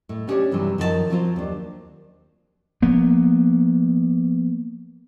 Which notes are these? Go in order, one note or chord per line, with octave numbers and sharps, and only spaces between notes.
A2
B3 C#4 D4 G4 G#4 C#5
G2 C3 E3 F#3
F#2 D#3 F3 C#4 B4 A5
F3 F#3 C4 D#4 F4 C5
D#2 D4
F3 A#3 B3